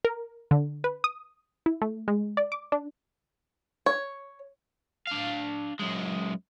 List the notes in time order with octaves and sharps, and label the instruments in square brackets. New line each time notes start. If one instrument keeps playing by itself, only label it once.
[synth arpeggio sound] A#4
D3
B4
D#6
E4
A3
G#3
D5
D6
D4
[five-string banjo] C#5
[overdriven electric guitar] D4 F5
F#2 G#3